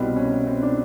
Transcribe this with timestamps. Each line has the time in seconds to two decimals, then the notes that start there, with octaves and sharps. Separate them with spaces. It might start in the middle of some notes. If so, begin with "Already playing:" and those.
Already playing: C2 B2 G3 C4
0.16 C#4
0.47 C4
0.62 D4